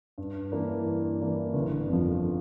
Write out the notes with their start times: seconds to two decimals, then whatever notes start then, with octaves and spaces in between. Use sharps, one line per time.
0.18 G2
0.52 E3 A#3 D4
0.86 G2
1.21 E3 A#3 D4
1.54 G1
1.88 F2 D3 F3